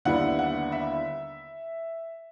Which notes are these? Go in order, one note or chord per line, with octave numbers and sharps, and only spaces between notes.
D#2 D3 G3 B3 E4 F#5
F#5
E5